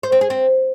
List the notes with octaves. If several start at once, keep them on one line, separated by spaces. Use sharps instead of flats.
C5
C4
G#4
C4